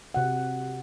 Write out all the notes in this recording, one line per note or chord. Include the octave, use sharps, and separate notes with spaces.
C3 F#4 F#5